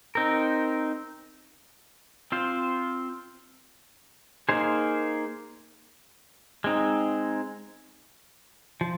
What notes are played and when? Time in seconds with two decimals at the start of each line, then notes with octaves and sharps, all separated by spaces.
0.15 C4 D#4 A#4
2.32 C4 F4 C5
4.49 A#3 D#4 G#4 C5
6.64 G#3 C4 D#4
8.81 F3